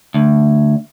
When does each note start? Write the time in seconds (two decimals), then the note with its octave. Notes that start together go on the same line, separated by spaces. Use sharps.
0.14 D2